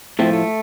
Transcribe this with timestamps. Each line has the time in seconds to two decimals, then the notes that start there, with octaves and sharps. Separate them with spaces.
0.19 A2 F3 A3 C4
0.33 A3